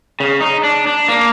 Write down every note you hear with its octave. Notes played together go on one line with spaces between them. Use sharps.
C#3
D#4
D4
D4
A#3